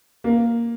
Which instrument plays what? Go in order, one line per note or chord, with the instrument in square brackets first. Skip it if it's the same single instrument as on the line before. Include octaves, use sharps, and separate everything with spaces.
[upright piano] A#3